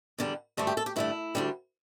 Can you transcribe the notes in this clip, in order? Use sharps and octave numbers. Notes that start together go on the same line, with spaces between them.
E2 D3 G3
G2 D3 A3 E4
G4
A4
G4
G2 D3 A3 E4
D2 D3 G3